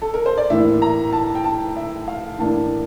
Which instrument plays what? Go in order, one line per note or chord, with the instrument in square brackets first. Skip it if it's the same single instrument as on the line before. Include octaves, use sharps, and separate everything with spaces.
[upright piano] A4
A#4
C5
D5
A2 E3 A#3 E5
A#5
A5
G5
A5
E5
F5
A2 E3 A#3 D4 A5